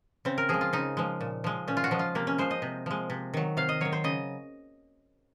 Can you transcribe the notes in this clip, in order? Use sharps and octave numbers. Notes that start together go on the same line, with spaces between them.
C#3 C4
A#4
F3 G#3 G#4
F4
C#3 D#4
F3 G#3
A#2
F3 G#3
A#2 C#4
F4
F#4
F3 G#3
F4
C3 A#3
C#4
F3 G#3 C5
D#5
C3
F3 G#3
C3
D#3 F#3
C3 F5
D#5
D#3 F#3 C#5
C5
C#3 D#5